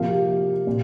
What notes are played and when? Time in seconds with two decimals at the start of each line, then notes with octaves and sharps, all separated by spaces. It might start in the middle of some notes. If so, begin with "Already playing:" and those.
Already playing: C3 F3 A#3 F5
0.10 G4
0.67 A#2